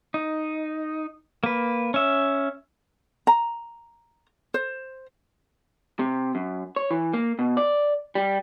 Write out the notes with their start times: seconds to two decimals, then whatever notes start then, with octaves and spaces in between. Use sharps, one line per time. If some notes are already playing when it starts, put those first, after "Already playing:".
0.14 D#4
1.44 A#3 B4
1.94 C#4 E5
3.27 A#5
4.54 C5
5.99 C3
6.35 F#2
6.76 C#5
6.91 E3
7.14 A#3
7.39 B2
7.57 D5
8.15 G3